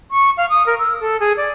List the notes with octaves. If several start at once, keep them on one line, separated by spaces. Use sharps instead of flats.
C#6
F5
D#6
A#4
E6
A4
G#4
D5